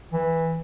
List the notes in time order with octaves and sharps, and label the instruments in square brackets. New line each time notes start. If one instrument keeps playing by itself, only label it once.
[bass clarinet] E3